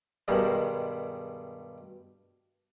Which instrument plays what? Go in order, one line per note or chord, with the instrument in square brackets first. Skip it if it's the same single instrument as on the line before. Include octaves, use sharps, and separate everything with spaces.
[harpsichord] G2 B2 D#3 G3 G#3